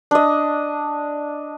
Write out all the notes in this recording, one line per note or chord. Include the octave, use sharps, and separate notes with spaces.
D4 D#5